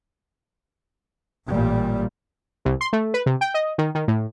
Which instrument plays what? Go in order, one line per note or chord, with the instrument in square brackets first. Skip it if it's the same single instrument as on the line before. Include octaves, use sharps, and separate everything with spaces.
[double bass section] A1 A#2 G3
[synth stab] C2
C6
A3
B4
C3
G5
D#5
D#3
D#3
A2